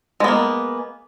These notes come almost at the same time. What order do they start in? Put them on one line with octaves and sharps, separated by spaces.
G#3 B3 A#3